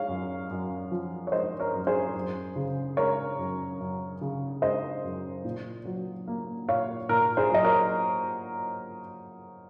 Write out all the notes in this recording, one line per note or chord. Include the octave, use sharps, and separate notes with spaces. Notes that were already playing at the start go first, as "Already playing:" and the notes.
Already playing: G#3 C#5 F5
F#2
F#2
F3
C#5
G#3 C5 D#5
A#4 C#5
F#2
G#4 C5
F#2
C#3
G#3 A#4 C#5
F#2
F#2
C#3
G#3 C5 D#5
F#2
A#2
F#3
A#3
A#2 C#5 F5
A#2 A#4
G#4 C5
F#3 D#5
A#4 C#5